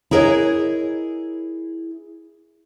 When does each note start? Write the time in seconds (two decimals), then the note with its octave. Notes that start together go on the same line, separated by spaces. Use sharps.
0.11 E4 G#4 A#4 B4 C#5 D#5